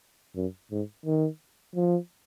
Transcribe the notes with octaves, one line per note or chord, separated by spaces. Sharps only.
F#2
G#2
D#3
F3